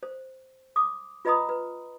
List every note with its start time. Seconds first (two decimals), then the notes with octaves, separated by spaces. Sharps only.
0.03 C5
0.76 D6 D#6
1.25 F4 B4 D#5 A#5 B5 D#6
1.49 B4